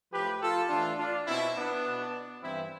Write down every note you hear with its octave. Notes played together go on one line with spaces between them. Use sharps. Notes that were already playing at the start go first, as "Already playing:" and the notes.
A2 F3 G4 B4
F4 A4
A2 E3 D4 F4
D4 F4
B2 C4 E4
B3 D4
B2
G2 E3 C4 E4